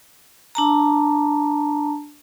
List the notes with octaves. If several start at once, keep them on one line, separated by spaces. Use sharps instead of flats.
D4 A5 A#5